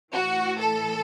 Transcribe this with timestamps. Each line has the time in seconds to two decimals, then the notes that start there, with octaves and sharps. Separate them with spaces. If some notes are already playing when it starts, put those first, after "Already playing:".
0.13 A2 E3 F#4
0.59 A4